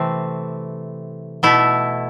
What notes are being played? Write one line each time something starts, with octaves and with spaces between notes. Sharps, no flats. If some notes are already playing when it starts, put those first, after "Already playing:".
Already playing: C3 E3 A3 C4
B2 A3 E4